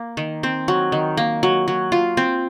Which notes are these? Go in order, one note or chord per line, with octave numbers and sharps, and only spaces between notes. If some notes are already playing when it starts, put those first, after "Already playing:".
Already playing: A#3
D#3
C4
F#3
D#3
A#3
F#3
F#3
F4
C4